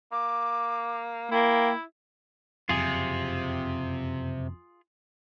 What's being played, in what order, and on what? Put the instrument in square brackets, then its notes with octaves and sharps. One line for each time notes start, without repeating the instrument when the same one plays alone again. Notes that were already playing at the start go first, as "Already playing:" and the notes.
[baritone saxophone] A#3 [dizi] D6
[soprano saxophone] A#3 [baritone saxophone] E4 [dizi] G5
[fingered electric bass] F#1 F2 [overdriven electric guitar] C3 [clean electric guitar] F4 G#4